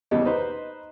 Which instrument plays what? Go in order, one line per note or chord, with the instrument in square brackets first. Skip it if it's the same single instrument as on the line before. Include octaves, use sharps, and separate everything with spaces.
[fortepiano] E2 C#3 G3 [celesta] D#5
[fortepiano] D#4 B4 C5